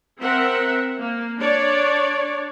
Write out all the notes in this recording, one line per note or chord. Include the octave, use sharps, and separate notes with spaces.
C4 A#4 E5 F#5
A#3
D4 C#5 D5